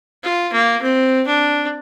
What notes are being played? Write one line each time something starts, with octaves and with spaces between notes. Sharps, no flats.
F4
A#3
C4
D4